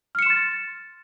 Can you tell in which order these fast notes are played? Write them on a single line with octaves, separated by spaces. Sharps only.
F6 C#7 E7 C6 A6